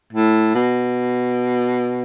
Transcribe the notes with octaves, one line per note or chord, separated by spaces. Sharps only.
A2
B2